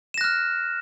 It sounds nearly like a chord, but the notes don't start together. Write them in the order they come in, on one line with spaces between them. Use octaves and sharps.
E7 A#6 F#6 F6